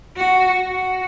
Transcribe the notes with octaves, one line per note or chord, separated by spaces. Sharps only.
F#4
F#4